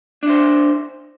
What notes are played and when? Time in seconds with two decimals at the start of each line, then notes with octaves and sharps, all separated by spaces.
0.23 D4
0.26 E4
0.30 C5